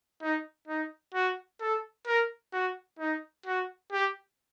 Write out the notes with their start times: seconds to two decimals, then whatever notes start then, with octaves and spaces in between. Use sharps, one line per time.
0.22 D#4
0.67 D#4
1.14 F#4
1.60 A4
2.07 A#4
2.53 F#4
2.99 D#4
3.46 F#4
3.92 G4